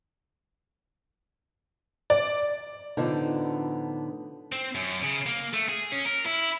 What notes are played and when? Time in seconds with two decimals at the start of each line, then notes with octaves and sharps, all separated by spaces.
2.10 D5
2.97 A2 D3 F3 B3 D4 D#4
4.52 C4
4.75 F#2
5.03 C#3
5.26 A#3
5.53 A3
5.69 G#4
5.92 C#4
6.06 A#4
6.26 E4